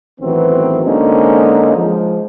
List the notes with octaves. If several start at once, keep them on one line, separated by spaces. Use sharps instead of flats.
A1 D#3 E3 F#3 B3 C4
D3 G#3 A#3 C4 C#4 D#4
F3 G#3